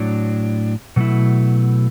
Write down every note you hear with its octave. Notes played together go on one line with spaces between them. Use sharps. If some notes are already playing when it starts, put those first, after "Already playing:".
Already playing: A2 F#3 D4
B2 F#3 A3 E4